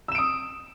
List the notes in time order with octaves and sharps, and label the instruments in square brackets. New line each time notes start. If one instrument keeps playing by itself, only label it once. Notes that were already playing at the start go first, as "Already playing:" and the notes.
[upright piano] E6
E7
D7
D#6